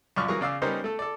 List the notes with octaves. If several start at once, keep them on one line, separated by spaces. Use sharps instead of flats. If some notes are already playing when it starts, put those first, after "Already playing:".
A#1 F#2 D5 C#6 F6
E3 F#3 G#4 A#4 C#6
C#3 D5 F5 E6
G3 B3 C#4 D#4 A#4 C5
A3 A4
A4 D5